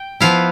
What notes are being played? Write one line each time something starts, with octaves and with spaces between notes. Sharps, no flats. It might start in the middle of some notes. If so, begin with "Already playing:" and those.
Already playing: G5
F3 B3 E4 F5